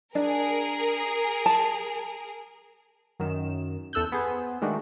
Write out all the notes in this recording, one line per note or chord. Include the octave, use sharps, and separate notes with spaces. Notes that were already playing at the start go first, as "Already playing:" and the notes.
D4 G#4 A#4
A5
F#2 D#3 E7
E2 A4 E6 F#6 G6
B3 G#4 C5
D#3 G#3 A3 D4 F#4